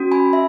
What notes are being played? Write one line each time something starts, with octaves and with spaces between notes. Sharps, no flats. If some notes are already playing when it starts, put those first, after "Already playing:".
Already playing: C#4 F#4
G#5 B5
E5